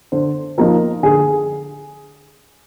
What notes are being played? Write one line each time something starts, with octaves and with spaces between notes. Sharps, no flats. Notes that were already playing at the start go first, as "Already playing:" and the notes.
D3 C5
F3 A#3 D#4 A#4
D3 G#4